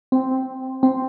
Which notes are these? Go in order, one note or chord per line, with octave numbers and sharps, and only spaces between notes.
C4
C4